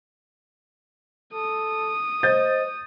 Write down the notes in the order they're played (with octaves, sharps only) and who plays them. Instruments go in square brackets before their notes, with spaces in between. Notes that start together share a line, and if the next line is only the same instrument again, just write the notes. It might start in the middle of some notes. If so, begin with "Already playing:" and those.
[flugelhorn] A4 [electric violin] D#6
[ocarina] C5 [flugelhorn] D#5 [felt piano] G6 A6